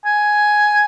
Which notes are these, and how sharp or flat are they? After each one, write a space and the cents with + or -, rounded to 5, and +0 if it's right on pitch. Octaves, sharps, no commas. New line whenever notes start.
G#5 +10